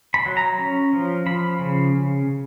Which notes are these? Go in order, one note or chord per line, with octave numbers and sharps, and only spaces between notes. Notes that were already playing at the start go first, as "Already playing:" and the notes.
B5
F#3
A#5
C#4
F3
F3 B5
C#3